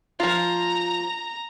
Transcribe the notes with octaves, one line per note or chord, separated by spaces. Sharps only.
F3 F4 A#5